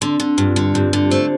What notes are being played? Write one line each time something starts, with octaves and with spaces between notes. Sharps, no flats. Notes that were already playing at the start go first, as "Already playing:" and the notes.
D3 C4
D3
G2 F4
D3
G2 G4
D3
A3 C5